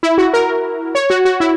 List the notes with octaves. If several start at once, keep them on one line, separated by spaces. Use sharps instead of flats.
E4
F#4
A#4
C#5
F#4
F#4
E4